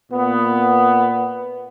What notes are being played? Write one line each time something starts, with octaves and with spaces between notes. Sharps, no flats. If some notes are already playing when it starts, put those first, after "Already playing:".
A#2 B3